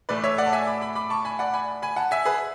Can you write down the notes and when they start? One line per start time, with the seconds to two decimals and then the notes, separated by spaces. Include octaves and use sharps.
0.09 A2 E3 A3 B4 D5
0.24 C#5 E5
0.38 D5 F#5
0.46 A5
0.53 E5 G#5
0.67 B5 D6
0.81 B5 D6
0.95 B5 D6
1.10 A5 C#6
1.25 G#5 B5
1.39 D5 F#5
1.53 G#5 B5
1.82 G#5 B5
1.96 F#5 A5
2.11 E5 G#5
2.25 G#4 B4